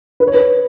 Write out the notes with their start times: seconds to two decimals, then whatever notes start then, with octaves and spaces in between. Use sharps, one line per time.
0.20 B4
0.27 C#5
0.34 B4